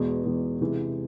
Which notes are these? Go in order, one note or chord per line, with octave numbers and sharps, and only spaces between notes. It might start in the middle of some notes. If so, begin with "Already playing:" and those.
Already playing: E2 B2 G#3
E2 B2 G#3
C3 E3 G#3